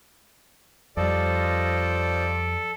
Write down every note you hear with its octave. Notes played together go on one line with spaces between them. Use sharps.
F2 G3 F4 A4 C5 D5 D#5